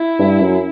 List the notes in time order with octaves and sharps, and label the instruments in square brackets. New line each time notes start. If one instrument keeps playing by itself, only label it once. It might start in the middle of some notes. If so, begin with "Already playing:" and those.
Already playing: [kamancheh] E4
[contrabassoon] G2
F#2